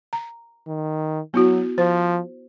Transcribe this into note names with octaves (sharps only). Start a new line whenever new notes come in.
A#5
D#3
F#3 B3 E4 F#4
F3 C5